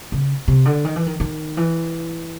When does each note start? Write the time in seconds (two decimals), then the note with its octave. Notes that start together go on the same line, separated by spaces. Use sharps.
0.12 C#3
0.48 C3
0.65 D3
0.85 D#3
0.96 E3
1.06 D#3
1.20 D#3
1.57 E3